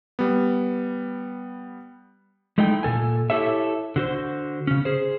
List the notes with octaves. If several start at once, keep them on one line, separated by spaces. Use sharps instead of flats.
G3 B3
G#3 A3 D#4 E4 G5
A#2 E3 A4 G#5
E4 G4 A4 C#5 E5
D3 F#4 C5
C#3 C#4
G#4 C5